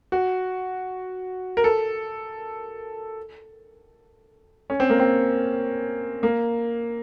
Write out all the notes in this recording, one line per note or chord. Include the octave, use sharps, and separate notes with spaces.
F#4
A#4
A4
C#4
C4
A#3
C4
A#3